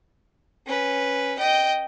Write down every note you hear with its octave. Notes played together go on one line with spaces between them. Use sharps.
C#4 B4
D#5 G5